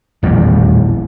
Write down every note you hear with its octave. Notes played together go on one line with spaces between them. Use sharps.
D#1 A1 E2 G3